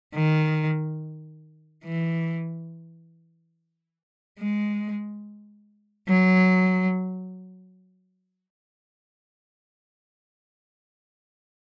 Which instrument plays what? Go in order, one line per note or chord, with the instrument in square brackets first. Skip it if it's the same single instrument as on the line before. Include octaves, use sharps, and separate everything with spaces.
[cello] D#3
E3
G#3
F#3